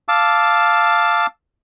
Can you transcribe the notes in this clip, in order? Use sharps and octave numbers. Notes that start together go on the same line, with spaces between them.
F5 A5 D6 E6